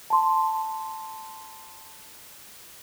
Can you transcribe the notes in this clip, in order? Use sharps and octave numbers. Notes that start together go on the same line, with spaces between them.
A5 C6